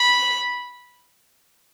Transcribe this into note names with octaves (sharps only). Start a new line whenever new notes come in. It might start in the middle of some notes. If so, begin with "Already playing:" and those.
Already playing: B5